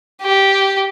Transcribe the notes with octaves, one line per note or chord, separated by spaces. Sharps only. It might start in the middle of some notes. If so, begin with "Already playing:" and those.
G4